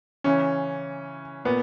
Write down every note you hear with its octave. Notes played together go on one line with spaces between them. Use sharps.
C#3 E3 C#4
A#2 B3